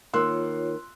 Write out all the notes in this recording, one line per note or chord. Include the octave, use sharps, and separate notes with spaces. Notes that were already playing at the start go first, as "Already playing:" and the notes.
D#3 A#3 F4 C#5 C6 E6 F#6